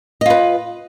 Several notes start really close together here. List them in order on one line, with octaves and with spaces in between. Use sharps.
D#5 F4 B4